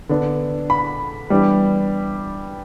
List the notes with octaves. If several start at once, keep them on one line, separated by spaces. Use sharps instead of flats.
D3 B3 D4
B5
E3 G3 B3 D4